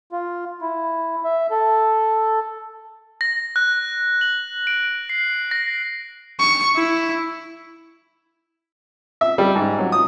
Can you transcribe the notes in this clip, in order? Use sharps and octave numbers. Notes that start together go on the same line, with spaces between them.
F4
E4
E5
A4
A#6
F#6
F#7
D7
C7
A#6
C#6
E4
E5
G3
G#2
F#3
D#6